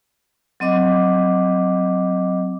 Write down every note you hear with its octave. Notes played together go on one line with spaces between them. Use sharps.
F#3 C4 D#5 D6